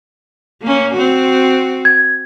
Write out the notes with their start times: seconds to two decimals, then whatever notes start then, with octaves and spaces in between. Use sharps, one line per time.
0.62 A#3 C#4
0.93 C4 F#4
1.85 G#6